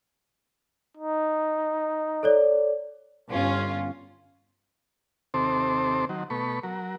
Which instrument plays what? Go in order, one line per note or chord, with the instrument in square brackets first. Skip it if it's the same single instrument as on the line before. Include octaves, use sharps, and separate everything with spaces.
[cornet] D#4
[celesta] A4 C#5 D5
[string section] G1 C#4 F4
[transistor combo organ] D#2 C3 C4 A4 C5 D6
D#3 F#3
B2 A3 B5 C#6
F#3 A#4